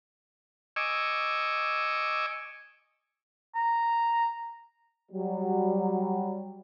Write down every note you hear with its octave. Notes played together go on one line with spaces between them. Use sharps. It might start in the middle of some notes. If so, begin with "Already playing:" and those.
D#5 G#5 C#6 D6 E6
A#5
F#3 G3